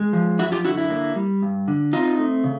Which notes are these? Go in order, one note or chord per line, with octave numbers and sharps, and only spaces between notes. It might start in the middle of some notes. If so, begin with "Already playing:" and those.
Already playing: G#3
F3
F#2 E4 F#4
F4 G4
D3 E4 F#4
E4
A#3
G3
G2
D3
C4 D#4 F4
A3
C#3